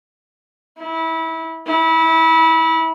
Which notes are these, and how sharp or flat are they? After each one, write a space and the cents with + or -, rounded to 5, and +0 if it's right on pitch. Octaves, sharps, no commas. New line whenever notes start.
E4 -25
E4 -25